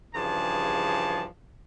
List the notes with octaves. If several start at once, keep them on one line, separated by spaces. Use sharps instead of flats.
G2 C#3 E3 F3 G#4 A5